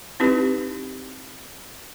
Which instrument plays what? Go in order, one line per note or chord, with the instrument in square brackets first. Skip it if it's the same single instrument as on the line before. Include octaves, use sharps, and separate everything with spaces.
[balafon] C4 D#4 E4 G4 B4